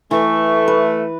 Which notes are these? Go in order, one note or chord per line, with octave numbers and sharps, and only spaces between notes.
E3 A3 C#6
B4